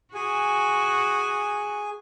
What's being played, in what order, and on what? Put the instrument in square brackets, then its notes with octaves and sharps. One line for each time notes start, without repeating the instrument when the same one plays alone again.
[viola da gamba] F#4 [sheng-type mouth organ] G#4 G#5